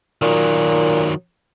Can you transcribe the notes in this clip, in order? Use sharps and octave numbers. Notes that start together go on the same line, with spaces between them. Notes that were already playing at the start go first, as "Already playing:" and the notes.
A#2 D#3 F#3